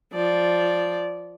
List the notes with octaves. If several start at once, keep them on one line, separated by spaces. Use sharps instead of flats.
F3 D5